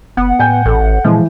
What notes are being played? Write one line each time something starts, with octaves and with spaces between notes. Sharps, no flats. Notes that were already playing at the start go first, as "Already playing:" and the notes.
F#1 B3 F#5
A2 G5 G#5 G6
A1 A4
G#1
A#2 E3 F3 G#3